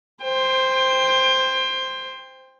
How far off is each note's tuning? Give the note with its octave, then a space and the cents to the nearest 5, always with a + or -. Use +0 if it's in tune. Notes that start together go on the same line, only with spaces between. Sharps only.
C5 +0 G5 +25